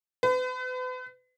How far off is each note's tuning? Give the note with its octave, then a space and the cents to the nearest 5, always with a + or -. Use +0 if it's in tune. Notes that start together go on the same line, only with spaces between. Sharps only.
B4 +40